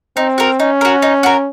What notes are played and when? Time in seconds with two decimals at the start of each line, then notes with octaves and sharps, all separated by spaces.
0.16 C4 D#4
0.38 F#4 A#4
0.59 C#4 D#4
0.81 F#4 A#4
1.02 D#4
1.23 F#4 A#4